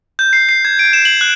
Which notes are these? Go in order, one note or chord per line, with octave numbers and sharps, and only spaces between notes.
G6
C7
C7
G#6
D7
E7
F#7
F#6